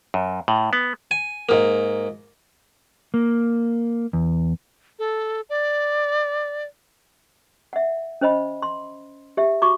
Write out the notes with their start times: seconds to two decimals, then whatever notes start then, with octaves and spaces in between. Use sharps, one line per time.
0.14 F#2
0.48 A2
0.73 B3
1.11 G#5
1.49 G#2 A#3
3.14 A#3
4.13 E2
4.99 A4
5.50 D5
7.73 E5 F#5
8.21 C#4 C5 D#5 B5
8.62 C6
9.37 G4 E5
9.62 F#4 C#6 D6